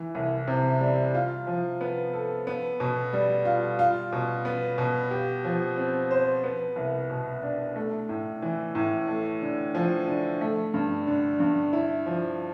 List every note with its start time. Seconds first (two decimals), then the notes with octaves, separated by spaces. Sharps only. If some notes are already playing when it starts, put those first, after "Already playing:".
Already playing: E3
0.15 C2
0.47 C3
0.81 G3
1.15 F4
1.47 F3
1.81 B3
2.13 A4
2.47 B3
2.80 B2
3.13 G3
3.45 F4
3.79 F4
4.12 B2
4.45 B3
4.78 B2
5.11 G4
5.44 F3
5.77 C4
6.11 C5
6.44 B3
6.76 C2
7.10 B2
7.42 D4
7.76 A3
8.09 A2
8.42 E3
8.75 A2
9.08 A3
9.42 D3
9.75 F3
10.07 D3
10.41 A3
10.74 G2
11.07 D3
11.40 G2
11.73 E4
12.06 F3